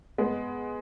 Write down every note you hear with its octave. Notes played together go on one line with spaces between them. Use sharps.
G#3 B3